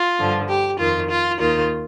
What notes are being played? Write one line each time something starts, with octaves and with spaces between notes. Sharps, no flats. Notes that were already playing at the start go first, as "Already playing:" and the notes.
Already playing: F4
G2 D3 F3
G4
F2 D#3 F4
F4
D#2 D#3 F4